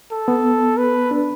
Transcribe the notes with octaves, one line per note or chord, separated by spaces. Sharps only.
A4
B3
B4
D4